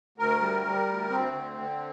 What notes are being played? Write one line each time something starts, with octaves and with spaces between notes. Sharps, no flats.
D2 A#4
G3
G3
D2
D2 C4
D3
D3